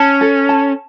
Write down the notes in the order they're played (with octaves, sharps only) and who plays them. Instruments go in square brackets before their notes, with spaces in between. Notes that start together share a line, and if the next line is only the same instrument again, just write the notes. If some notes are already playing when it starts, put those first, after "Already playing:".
Already playing: [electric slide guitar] C#4 [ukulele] A5
[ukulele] A4
A5